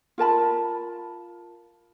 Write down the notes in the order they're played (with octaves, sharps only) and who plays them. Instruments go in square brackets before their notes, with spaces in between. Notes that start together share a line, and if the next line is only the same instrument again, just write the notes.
[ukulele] F4 A#4 A5 B5